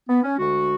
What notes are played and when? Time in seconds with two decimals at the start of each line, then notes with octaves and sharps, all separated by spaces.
0.08 B3
0.23 C#4
0.38 D2 D3 G#3 F#4